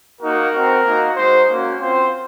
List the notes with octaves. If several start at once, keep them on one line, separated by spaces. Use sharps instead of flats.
A#3 D#4 F#4 A#4
C4 F#4
A#3 D#4 F#4
G#3 D#4 F#4 C5
A#3 C#4 F#4
C4 F4 C5